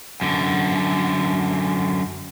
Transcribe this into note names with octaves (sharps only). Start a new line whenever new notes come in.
F#2 D3